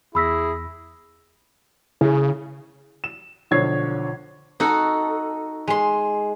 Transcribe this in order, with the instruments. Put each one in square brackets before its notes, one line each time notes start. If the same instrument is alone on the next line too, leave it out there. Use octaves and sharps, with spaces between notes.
[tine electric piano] E2 A#6 [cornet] E4 [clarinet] G#4 [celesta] B5 E6 B6
[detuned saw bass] C#3 [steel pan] E4 G#4
[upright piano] E7
B1 D3 F3 C#5 G#6 C7
[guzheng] D#4 F#4 A4
G#3 C6